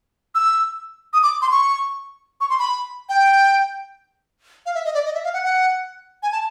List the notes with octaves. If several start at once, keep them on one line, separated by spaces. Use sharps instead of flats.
E6
D#6
D6
C6
C#6
C#6
C6
B5
G5
F5
E5
D#5
D5
D#5
E5
F5
F#5
F#5
G#5
A5